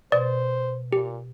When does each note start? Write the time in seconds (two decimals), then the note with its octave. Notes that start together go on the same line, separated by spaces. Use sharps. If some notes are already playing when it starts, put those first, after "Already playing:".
0.12 B2 C5 D5
0.93 A#2 G4